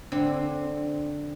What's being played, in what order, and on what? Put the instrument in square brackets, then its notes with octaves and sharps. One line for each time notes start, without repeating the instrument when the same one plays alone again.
[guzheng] D3 C4